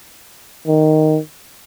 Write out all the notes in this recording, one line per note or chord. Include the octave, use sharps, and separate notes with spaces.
D#3